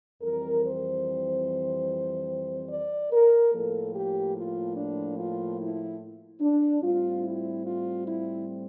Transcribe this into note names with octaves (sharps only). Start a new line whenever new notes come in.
F2 E3 G3 C4 A#4
C5
D5
A#4
A2 F3 A#3 A4
G4
F4
D4
F4
E4
D4
A2 G3 C4 F4
E4
F4
E4